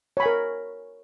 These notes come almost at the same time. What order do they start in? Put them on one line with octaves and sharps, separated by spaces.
C#5 B5 G#5 A#4